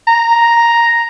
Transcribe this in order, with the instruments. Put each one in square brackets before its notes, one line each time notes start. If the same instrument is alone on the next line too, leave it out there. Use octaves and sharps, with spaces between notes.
[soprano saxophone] A#5